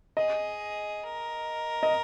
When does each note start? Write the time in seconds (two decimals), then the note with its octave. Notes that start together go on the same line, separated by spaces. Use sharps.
0.17 G#4 D#5
1.03 A#4
1.83 D#5